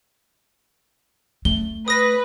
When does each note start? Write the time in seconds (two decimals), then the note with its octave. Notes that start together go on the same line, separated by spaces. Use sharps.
1.45 A3 G7
1.88 B4 D#6 A#6